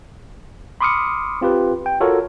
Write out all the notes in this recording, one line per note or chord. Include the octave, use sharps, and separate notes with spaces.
B5 C6 D6 D#6 F6 C#7
C4 F4 G4 B4
G5
F4 F#4 A4 A#4 C#5